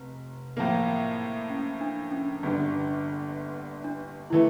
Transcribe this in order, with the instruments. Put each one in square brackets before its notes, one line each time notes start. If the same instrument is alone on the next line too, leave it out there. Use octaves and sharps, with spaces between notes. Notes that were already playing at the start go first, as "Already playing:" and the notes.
Already playing: [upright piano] F1
A2 F3 A#3
[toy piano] C#4
D4
C#4
[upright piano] G1 G2 D3
[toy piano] D4
[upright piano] E3 A3 [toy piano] E4